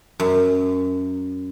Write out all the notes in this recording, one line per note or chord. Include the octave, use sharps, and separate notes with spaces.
F#2